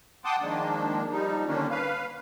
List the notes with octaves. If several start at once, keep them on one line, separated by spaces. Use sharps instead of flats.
F#5 G5 A5 C6 D6 D#6
D#3 F3 G#3 A#3 D4
F3 G3 D#4
D3 D#3 A#3 C#4 D4
B4 F5